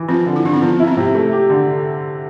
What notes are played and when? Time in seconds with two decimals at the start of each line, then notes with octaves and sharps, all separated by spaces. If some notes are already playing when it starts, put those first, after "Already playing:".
Already playing: E3
0.09 F3 C4
0.26 D3
0.36 E4
0.44 D3 D4
0.54 C4
0.62 F3 B3
0.80 B3 E4
0.88 C4
0.97 C3
1.15 A3
1.32 G4
1.50 D3